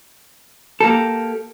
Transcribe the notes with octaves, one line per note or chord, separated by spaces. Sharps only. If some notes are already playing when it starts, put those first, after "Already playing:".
A#3 G4 A4